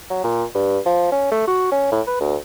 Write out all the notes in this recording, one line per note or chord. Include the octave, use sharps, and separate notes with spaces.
F#3
A#2
G2
F3
C#4
A3
F#4
C#4
A2
B4
D2